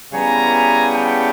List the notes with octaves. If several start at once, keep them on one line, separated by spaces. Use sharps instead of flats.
C#3 E3 G3 B3 G#5 A#5
G5 A5